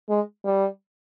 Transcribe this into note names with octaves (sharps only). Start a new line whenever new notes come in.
G#3
G3